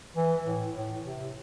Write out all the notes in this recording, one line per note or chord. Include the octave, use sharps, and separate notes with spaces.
E3
A2
A2
C3